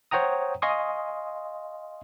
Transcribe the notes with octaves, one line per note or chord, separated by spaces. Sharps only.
C5 C#5 F#5 G5 A#5 D#6
D#5 F5 G#5 C6 C#6 D#6